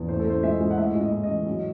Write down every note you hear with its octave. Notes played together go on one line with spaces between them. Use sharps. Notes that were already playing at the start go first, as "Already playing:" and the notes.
Already playing: E2
A2 C5
A4
A2 C5
G#3 E5
G#3
F#5
A2 E5
G#3
D#5
A2
D#5
E3
F#3